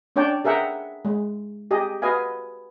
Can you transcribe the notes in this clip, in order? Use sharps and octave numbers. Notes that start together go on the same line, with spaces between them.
C#4 D4 C#5 D5 G5 A5
G#4 A#4 E5 F#5 G5
G#3
G4 G#4 D#5
F#4 B4 D#5 F5 G#5